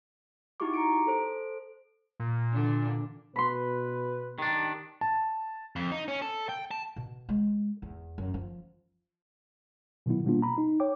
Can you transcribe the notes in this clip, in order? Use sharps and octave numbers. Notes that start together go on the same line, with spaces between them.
D#4 E4 F#4 G4 C#6 D6
A#5 C#7 D7
A4 C5 D7
A#2
D3 E3 D4
B2 B4 B5 C6
D#3 D4 G4
A5
F2
D#4
C#4
A4
G5
A5
B2
G#3
E2
F#2
F3
B2 D#3 F#3 B3 E4
B2 G3 A#3 B3 D4 F4
A#5 B5
D#4
C#5 G5 D6